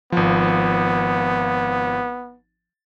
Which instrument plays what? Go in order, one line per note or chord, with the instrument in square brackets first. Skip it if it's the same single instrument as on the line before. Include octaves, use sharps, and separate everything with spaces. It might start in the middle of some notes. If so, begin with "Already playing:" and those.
[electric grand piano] G#1 F3 [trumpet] B3